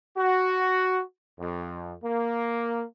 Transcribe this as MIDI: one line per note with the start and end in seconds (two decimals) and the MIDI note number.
0.17 1.00 66
1.40 1.93 41
2.03 2.83 58